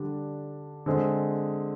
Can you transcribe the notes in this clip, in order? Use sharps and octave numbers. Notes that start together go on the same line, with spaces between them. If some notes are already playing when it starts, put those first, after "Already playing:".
Already playing: D3 G3 D4
D3 G#3 C4